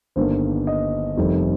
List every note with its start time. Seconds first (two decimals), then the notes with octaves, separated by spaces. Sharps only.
0.16 G1 G2 D#3 A#3 C5
0.67 D#5
1.17 F1 F2 D#3 G3